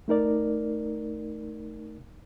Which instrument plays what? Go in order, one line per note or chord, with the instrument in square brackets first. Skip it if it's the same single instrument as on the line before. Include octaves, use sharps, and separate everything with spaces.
[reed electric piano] A3 D#4 A#4 D5